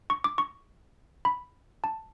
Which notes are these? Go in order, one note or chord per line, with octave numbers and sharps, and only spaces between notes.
C#6
D6
C#6
B5
A5